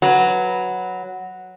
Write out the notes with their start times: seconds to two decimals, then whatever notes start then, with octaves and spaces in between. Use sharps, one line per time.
0.02 F#3 B4